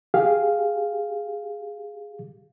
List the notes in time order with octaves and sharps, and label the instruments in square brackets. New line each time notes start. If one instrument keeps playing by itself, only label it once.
[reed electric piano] G4 G#4 F5